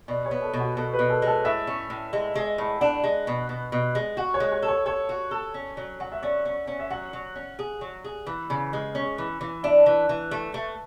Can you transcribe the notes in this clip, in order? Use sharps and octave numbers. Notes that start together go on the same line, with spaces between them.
B2 D5
C#5
B3
A4
B2
F#4
B2 A4
B4
B2
A4
G#3 A4
A2 E5
C#4
A2
G#3
G#3
A2
D4 F#5
G#3
B2
B2
B2
G#3
F#4 F#5
C#5
G#3
C#5
A4
C#5
A4 C#5
F#4
A4
C#4
F#3
F#3 F#5
E5
C#4 D5
C#4
C#4
E5
F#3 F#5
F#3
C#4
G#4
F#3
G#4
E3
C#3
G#3
C#4
E3
E3
D4 E5
E3
E3
A3
A3